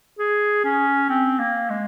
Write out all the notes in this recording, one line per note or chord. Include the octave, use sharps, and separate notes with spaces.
G#4
C#4
C4
A#3
G#3